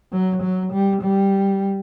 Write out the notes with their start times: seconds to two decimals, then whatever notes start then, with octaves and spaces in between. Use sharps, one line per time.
0.12 F#3
0.42 F#3
0.72 G3
1.02 G3